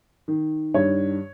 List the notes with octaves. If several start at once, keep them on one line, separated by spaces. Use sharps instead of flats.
D#3
G2 C#5